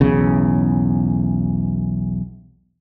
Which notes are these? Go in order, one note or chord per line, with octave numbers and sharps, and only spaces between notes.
B1 E2 C#3